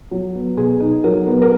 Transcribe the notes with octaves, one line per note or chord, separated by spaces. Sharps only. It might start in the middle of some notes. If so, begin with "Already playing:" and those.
F#3
B3
B2 G#4
D#4
F#3 A#4
B3
A#4